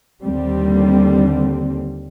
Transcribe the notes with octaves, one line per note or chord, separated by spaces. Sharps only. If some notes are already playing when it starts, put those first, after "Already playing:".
D#2 D3 G3 C4